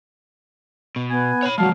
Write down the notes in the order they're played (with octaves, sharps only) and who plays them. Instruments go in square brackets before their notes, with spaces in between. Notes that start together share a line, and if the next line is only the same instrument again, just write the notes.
[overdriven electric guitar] B2
[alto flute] B3 [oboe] G#5
[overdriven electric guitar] C#5 B5
[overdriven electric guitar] F3 G#3 [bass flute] F#3 [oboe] F5 [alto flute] A5